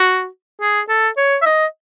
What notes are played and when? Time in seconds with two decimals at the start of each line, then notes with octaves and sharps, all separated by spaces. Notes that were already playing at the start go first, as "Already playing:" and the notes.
Already playing: F#4
0.61 G#4
0.89 A4
1.17 C#5
1.42 E5
1.46 D#5